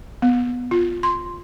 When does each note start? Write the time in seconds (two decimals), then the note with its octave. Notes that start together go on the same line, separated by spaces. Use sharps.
0.22 B3
0.71 F4
1.03 C6